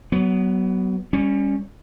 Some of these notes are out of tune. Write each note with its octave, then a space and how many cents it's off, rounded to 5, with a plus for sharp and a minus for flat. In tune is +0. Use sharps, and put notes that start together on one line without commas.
F#3 +30 B3 +0
G3 +30 C#4 +0